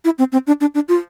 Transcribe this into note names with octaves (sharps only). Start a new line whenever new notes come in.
E4
C4
C4
D4
D4
D4
F4